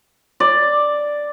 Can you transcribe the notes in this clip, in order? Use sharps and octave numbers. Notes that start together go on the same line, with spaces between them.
D5